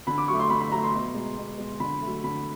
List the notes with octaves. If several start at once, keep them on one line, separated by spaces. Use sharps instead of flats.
D3 B5
D6
F#3 A3 C#6
C6
D3 B5
B5
F#3 A3 A#5
C6
B2
G#3
B2
G#3
D3 B5
F#3 A3
D3 B5